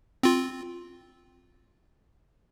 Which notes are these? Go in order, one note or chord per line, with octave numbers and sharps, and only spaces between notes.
C4 F4